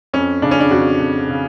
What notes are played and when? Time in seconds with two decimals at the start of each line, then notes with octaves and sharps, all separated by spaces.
0.13 F2 C#4
0.42 C#3 D4
0.51 C#4
0.60 D4
0.71 F2 F#4
1.00 F2
1.29 C#3